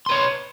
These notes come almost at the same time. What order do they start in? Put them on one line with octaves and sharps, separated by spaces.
C6 B4 C#5